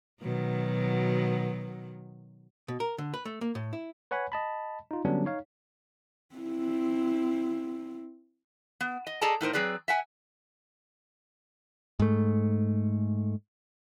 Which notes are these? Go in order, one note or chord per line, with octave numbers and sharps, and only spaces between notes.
B2 D#3 F#3
B2
A#4
D3
B4
A3
A#3
A2
E4
B4 C#5 F#5 G#5 B5
D#5 A5 B5
D#4 F4
D3 F#3 G3 B3 C#4 D4
D#4 C#5 F5
C4 E4
B3
D#5
G#4 A4 D5 D#5 A5 A#5
A2 D#4 A#4 C5
F#3 C4 G#4 B4 D5
E5 F#5 G#5
G#2 A3